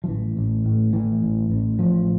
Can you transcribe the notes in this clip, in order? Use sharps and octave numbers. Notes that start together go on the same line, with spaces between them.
F3
A1 E3
A1
A2
A2 E3
A1
A1
A2 F3